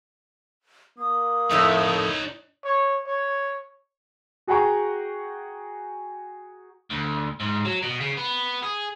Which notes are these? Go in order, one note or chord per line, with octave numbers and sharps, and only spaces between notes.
A#3 D#6
F2 A2 A3 D#4 C#5
C#5
C#5
F#4 G#4 F#5 G5 A#5 C#6
D2
G#2
F#3
B2
C#3
B3
G#4